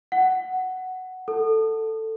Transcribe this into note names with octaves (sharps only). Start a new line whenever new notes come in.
F#5
A4